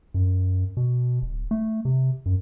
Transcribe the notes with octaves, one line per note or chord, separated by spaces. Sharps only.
F#2
B2
D1
A3
C3
F#2